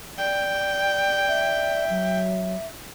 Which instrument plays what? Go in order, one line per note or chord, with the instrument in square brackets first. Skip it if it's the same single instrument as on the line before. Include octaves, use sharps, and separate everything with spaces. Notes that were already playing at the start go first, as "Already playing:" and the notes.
[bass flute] D5 [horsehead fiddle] G5
[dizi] E5
[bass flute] F#3